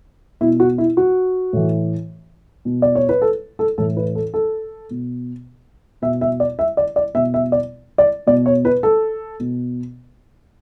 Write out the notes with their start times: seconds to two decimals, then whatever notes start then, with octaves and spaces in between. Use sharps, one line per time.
0.41 B2 E4
0.60 F#4
0.78 E4
0.97 F#4
1.53 A2 E3
2.65 B2
2.82 D5
2.95 C#5
3.09 B4
3.22 A4
3.59 A4
3.78 A2 E3 A4
3.97 B4
4.15 A4
4.34 A4
4.90 B2
6.02 B2 E5
6.21 E5
6.40 D5
6.59 E5
6.77 D5
6.96 D5
7.15 B2 E5
7.34 E5
7.52 D5
7.98 D5
8.27 B2 D5
8.46 C#5
8.65 B4
8.83 A4
9.40 B2